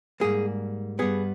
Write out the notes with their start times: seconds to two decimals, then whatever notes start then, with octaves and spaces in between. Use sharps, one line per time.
0.20 G#2 G3 A#3 G#4
0.99 G2 G3 B3 G#4